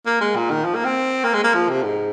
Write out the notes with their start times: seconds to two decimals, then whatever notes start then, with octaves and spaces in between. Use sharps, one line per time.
0.06 A#3
0.21 G#3
0.36 A#2
0.50 D#3
0.65 F3
0.75 A#3
0.85 C4
1.24 A#3
1.34 G#3
1.44 A#3
1.54 F3
1.69 C3
1.83 G#2